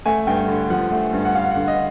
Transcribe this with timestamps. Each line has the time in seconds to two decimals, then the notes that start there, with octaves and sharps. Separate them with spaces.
0.06 A3 G#5
0.27 G2 G5
0.48 D3
0.70 F3 F#5
0.92 A3
1.13 G2
1.25 F#5
1.35 D3 F5
1.51 F#5
1.57 D3
1.68 D#5